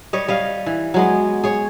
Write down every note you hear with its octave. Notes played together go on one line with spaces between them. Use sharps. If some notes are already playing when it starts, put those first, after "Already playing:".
G3 C#5 D#5
G3 D#5 F5
E3
F#3 G#3 B3
G#4 C#5